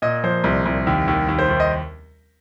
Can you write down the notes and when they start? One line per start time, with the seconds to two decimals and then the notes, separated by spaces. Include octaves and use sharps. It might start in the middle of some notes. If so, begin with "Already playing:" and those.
0.02 A#2 D#5
0.24 F3 C5
0.44 C2
0.66 C2
0.87 D#2
1.08 D#2
1.28 D#2
1.39 C5
1.49 D#2
1.60 D#5